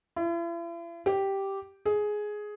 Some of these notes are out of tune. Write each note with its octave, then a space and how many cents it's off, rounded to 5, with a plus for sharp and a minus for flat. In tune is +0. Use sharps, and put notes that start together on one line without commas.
E4 +45
G4 -5
G#4 +10